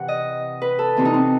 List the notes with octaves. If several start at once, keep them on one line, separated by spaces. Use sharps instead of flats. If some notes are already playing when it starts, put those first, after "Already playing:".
Already playing: C3 E3 F#5
D#5
B4
A4
C3 E3 C4
D#4
C4